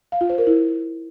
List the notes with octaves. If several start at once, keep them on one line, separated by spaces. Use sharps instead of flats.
F5
F4
C5
A#4
E4